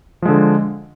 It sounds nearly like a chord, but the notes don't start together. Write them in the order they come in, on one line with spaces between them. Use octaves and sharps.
F3 G#3 D3